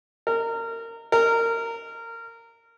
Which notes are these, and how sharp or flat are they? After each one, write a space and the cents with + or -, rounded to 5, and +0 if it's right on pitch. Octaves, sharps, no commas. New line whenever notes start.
A#4 -25
A#4 -20